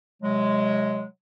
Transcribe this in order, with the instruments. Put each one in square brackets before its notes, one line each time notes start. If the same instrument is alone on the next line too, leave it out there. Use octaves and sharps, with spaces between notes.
[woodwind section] C3 F#3 G#3